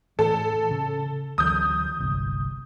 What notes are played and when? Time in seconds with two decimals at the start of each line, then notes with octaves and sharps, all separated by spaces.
0.19 A2 E3 A4
0.71 C#3
1.38 D2 E3 F#3 D#6 G6
2.00 G1 C2